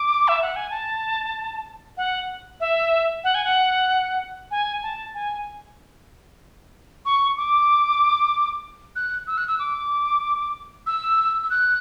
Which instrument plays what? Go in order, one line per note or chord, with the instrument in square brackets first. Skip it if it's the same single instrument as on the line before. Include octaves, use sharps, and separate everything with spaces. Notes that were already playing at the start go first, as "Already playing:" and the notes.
Already playing: [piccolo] D6
E5
F#5
G#5
A5
F#5
E5
F#5
G#5
F#5
G#5
A5
G#5
C#6
D6
F#6
E6
F#6
E6
D6
E6
E6
F#6